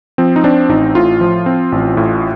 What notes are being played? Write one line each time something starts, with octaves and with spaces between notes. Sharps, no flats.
F3 C4
D#4
C4 D4
A1 D#4
A2 F4
F3
C4
A1
A2